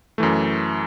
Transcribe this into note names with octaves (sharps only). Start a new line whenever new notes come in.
F#2 E3 A3